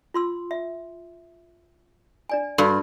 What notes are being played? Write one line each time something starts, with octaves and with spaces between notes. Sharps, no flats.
F4 C6 E6
E5
D4 D5 G#5
G2 F#4 A4 D5